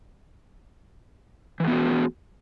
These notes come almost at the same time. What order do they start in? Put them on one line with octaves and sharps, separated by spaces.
E3 A3 B3 F#4 G#4